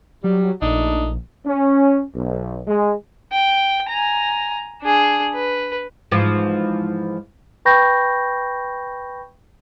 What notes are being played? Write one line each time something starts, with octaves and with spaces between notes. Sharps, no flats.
F#3 G3
A#1 A3 D4 D#4
C#4
B1
G#3
G5
G#5 A#5
D4 G#4
B4
G#2 E3 F3
B4 G5 B5 C#6 G6 A#6